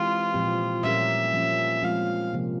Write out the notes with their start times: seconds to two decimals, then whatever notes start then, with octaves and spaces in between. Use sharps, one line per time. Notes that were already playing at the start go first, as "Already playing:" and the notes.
Already playing: E3 G#3 C4 F4 G4
0.34 A#2 F3 C4 G4
0.83 A#2 G3 C#4 G4 A#4 E5
1.34 F3 A#3 C#4
1.83 F3 G#3 C4 F4 F5
2.33 C3 F3 A#3